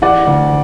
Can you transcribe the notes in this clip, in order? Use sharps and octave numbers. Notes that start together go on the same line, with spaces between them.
E3 D5 F#5
D2